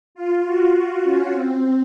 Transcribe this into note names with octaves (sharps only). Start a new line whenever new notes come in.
F4
F#4
F4
C#4
C4